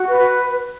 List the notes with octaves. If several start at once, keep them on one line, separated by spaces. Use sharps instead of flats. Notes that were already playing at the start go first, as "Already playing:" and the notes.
Already playing: F#4
B4